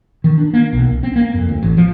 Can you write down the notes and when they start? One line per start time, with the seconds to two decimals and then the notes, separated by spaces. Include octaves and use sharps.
0.24 D#3
0.38 D4
0.53 A#3
0.73 B1
0.90 C2
1.03 C4
1.16 A#3
1.34 F2
1.49 D2
1.63 A1
1.77 F3